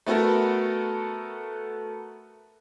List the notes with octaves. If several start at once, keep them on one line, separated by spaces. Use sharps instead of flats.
A3 B3 F#4 A4 A#4